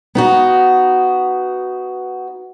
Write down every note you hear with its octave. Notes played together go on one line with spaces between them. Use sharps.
B3 D#4 F#4